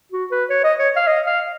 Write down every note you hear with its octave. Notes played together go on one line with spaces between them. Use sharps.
F#4
B4
C#5
D#5
C#5
F5
D#5
F5